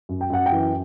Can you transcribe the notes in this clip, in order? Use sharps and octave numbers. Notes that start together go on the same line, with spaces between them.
F#2
G5
F#2 F#5
G5
E3